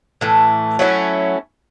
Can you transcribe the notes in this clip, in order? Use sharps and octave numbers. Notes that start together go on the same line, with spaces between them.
A2 E3 A3
F#3 A3 C#4 E4